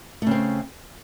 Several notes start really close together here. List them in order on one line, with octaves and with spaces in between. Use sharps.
A3 C#3 C4